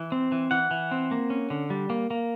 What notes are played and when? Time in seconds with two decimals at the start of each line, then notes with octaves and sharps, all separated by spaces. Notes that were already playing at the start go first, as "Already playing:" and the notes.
Already playing: E3
0.12 C4
0.32 E3
0.51 E3 F#5
0.71 E3
0.91 C4
1.11 A#3
1.30 C#4
1.50 D3
1.70 G3
1.90 A#3
2.11 A#3